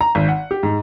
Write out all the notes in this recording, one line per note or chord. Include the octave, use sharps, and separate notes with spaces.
A#5
G#1
F#5
G4
G#2